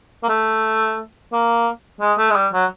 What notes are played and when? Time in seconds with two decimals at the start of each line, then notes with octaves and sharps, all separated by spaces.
0.23 A#3
0.29 A3
1.33 A#3
2.01 G#3
2.18 A3
2.30 G#3
2.35 G3
2.53 F#3